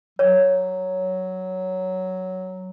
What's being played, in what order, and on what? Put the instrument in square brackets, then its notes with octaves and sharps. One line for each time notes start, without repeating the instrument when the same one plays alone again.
[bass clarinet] F#3 [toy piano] C#5